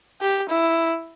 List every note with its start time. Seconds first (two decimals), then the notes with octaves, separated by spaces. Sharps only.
0.21 G4
0.49 E4